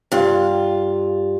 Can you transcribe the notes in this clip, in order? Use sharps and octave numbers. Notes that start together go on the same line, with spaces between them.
G2 F4